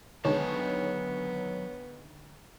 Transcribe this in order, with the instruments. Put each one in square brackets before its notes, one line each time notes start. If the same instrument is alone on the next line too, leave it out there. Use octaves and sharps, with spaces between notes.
[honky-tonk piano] D2 D#3 G#3 [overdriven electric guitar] F#3 A5 [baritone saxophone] B3 [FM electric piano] C#5